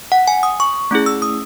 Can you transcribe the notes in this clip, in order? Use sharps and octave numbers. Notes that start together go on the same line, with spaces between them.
F#5
G#5
D#6
C#6
A3 C#4 E4 G#4
E6
D#6